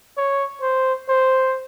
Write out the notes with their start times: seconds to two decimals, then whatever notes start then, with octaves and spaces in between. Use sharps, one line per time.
0.17 C#5
0.61 C5
1.09 C5